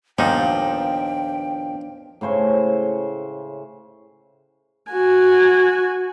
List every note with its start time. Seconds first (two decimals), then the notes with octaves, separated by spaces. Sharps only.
0.19 D#2 A#2 F3 B3 D4 D#4 F5 G5
2.21 A2 C#3 C5 C#5
4.91 F#4 G#5